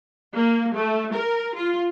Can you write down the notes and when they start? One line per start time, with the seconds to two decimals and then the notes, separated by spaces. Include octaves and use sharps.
0.33 A#3
0.73 A3
1.13 A#4
1.55 F4